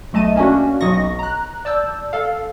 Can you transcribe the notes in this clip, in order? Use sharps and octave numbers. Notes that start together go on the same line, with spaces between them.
B1 A3 D#5 A5 D#7
A#3 C#4 D4 F#4
B1 F#3 D#5 C#6 A#6
A#5 F#6
D5 A5 E6 G6
A4 F5